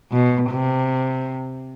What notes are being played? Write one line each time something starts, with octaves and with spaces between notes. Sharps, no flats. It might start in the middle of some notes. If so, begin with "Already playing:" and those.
B2
C3